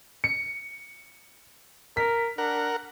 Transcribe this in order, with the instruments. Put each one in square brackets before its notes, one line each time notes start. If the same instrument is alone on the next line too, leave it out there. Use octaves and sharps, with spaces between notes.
[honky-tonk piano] C#7
[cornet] A#4 [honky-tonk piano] B6
[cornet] D4 [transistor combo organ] A#4 F#5